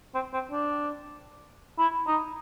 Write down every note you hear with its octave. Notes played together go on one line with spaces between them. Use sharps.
C4
C4
D4
E4
D#4